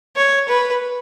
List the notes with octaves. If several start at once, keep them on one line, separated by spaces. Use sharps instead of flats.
C#5
B4